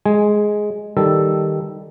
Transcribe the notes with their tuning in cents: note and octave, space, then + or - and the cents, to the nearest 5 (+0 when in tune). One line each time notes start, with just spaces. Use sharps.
G#3 +5 G#5 +0
D#3 +0 G3 +0 A4 +0